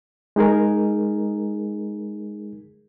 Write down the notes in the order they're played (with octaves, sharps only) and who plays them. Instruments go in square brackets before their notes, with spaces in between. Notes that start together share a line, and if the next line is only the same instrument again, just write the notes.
[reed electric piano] G#3 D#4 G#4 A#4